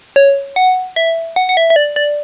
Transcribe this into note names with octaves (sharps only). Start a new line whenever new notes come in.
C#5
F#5
E5
F#5
F#5
E5
E5
D5
D5